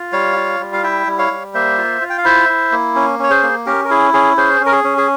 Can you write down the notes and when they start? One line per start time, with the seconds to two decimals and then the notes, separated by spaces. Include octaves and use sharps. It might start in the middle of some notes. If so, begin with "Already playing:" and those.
Already playing: F4
0.12 G3 C#5 F5
0.36 F4
0.60 G3
0.73 F5
0.83 E4 E5 G5
1.07 G3
1.18 C#5 F5
1.31 G3
1.54 A#3 C5 E5
1.78 F4
2.01 F4
2.10 G5
2.18 F5
2.24 E4 C5 E5
2.49 E4
2.72 A#3
2.95 C#4
3.19 C#4 C#5
3.30 G#4 C5
3.43 A#3
3.66 C#4 G4 A#4
3.85 A#4
3.90 E4 G#4
4.13 C#4 G#4
4.37 C#4 G#4 C5
4.61 C#4
4.66 A#4
4.72 G#4
4.84 C#4
4.98 G#4